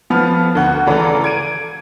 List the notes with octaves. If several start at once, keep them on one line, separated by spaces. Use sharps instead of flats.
F2 F3 B3 F6
D2 F#5
C#2 E3 A3 D5 A#5
G#6 D7 D#7